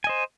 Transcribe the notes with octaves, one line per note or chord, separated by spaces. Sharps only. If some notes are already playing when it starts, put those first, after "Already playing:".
C5 D#5 G#5